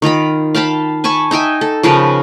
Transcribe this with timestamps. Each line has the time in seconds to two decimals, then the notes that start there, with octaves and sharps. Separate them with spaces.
0.02 D#3 F4 A#5 B5
0.55 F5 G5 A5 B5
1.04 G#5 A5 B5 C#6
1.31 D#4 E5 G5 G#5
1.61 A4
1.83 C#3 F3 A#4 B4